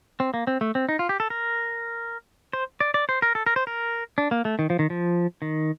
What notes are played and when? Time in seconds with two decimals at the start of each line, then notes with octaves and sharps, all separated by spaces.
0.20 C4
0.34 A#3
0.47 C4
0.61 A3
0.75 C4
0.89 D#4
0.99 F4
1.09 G4
1.20 A4
1.30 A#4
2.53 C5
2.81 D5
2.94 D5
3.09 C5
3.22 A#4
3.35 A4
3.46 A#4
3.56 C5
3.67 A#4
4.18 D4
4.31 A#3
4.45 A3
4.59 D#3
4.70 F3
4.79 D#3
4.90 F3
5.42 D#3